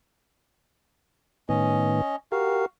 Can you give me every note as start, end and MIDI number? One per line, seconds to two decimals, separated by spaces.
1.49 2.01 45
1.49 2.01 51
1.49 2.01 59
1.49 2.16 61
1.49 2.16 75
2.32 2.65 66
2.32 2.66 67
2.32 2.66 70
2.32 2.65 77